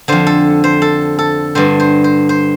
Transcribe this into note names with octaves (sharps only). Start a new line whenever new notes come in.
F2 D3 C5
A4
C5
A4
A4
G2 D3 C5
C5
C5
C5